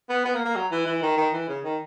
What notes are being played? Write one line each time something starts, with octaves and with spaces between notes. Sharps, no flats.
B3
B3
A#3
A#3
F#3
E3
E3
D#3
D#3
E3
C#3
D#3